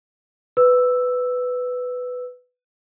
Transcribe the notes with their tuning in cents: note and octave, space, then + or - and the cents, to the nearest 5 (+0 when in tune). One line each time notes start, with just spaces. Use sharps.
B4 +10 E6 +0